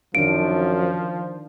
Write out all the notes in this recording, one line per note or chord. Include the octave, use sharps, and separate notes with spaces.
F#2 D#3 F3 D4 F5 D7